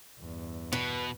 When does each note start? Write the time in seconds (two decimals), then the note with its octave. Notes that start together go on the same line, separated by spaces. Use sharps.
0.19 E2 G2
0.73 B2 B4